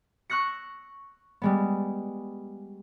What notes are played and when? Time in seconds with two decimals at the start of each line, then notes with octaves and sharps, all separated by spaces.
0.30 C#6 E6 F#6 A#6 C#7
1.42 G3 G#3 B3